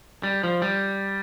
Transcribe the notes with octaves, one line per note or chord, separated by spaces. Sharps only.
G3
F3
G3